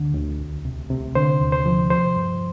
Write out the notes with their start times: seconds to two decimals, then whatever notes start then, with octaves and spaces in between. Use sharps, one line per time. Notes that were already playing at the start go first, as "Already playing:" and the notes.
Already playing: D2 D3
0.15 D2
0.40 C2
0.65 C3
0.90 C3
1.15 D3 C5
1.40 D#2
1.52 C5
1.66 F3
1.90 F3 C5
2.16 G2